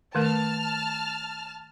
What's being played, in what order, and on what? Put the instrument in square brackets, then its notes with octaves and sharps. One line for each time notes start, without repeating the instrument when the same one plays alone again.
[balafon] D#3 A3 A#4 [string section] A5 F6